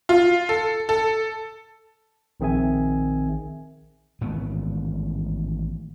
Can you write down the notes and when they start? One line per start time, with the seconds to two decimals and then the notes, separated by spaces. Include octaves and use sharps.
0.09 F4
0.49 A4
0.89 A4
2.40 A#1 D#3 C4 G#4 E5 G#5
4.21 A1 G#2 D#3 B3